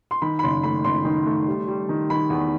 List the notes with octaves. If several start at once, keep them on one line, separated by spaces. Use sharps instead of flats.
C6
D#3 B5
B5
F#1 C6
A3 B5
F#1 C6
D#3
A3
G3
G3
D#3
D#3 B5
E2